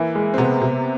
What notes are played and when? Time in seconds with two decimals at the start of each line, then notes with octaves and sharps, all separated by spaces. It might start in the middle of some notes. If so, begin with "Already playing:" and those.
Already playing: E3 A#3
0.15 G#3
0.34 C4
0.38 C3 B3
0.61 C3